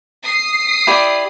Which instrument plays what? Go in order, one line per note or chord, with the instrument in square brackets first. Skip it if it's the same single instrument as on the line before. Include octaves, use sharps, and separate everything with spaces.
[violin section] D#6 C7
[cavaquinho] E4 G4 D5